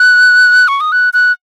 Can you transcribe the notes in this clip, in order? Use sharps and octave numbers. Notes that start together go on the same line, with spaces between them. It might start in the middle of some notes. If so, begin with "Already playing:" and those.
Already playing: F#6
C#6
D#6
F#6
F#6